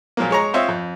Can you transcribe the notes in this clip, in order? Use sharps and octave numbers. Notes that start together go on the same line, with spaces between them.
A#2 F3 F#3 A#3
G#3 C#5 A#5
C4 F4 C#5 D#5 E5
F2